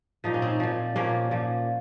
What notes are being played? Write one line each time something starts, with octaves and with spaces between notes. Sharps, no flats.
A#2 F3 D#4
C#4
C4 D#4
A#2 F3
A#2 F3 A#3 C#4
A#2 F3